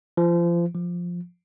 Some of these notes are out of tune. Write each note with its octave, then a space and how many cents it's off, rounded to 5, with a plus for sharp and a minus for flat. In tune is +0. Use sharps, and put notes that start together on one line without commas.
F3 -30
F3 +5